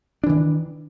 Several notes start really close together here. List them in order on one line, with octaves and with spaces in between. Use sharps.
D4 E3 D#3